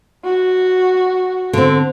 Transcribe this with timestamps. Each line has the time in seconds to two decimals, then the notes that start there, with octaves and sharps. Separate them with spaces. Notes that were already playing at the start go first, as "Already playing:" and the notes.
0.24 F#4
1.53 D3 C4